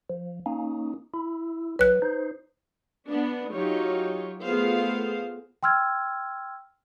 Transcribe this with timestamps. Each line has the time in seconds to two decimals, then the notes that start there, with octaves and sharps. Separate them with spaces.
0.10 F3
0.46 A#3 C#4 D#4
1.14 E4
1.79 F#3 B4 F#6
2.02 D#4 C5
3.09 B3 D4
3.52 F#3 D#4 F4 G4 C#5
4.43 A3 B3 F4 G#4 C5 F5
5.63 G5 C6 E6 F6 G#6